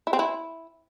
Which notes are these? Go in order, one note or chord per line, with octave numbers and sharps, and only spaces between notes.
E4
C4
E4